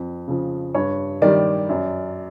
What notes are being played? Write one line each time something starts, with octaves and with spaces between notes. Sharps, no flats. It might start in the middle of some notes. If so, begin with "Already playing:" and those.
Already playing: F2
C#3 F3
G2 C#5
D#3 G3 D5
F#2